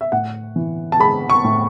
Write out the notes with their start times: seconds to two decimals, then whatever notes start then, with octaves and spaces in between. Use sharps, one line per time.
0.01 E5
0.12 A2 F#5
0.56 E3
0.92 A5
1.00 G#3 B5
1.30 C#6
1.44 A2